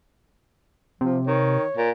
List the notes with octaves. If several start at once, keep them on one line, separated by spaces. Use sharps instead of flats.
C3 F3
D#3 C#5
A#2